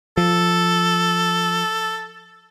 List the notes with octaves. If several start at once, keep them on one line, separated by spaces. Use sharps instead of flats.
F3 A4